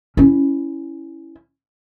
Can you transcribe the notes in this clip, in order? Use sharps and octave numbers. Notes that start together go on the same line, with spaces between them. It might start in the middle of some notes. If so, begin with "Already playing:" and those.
C#4 E4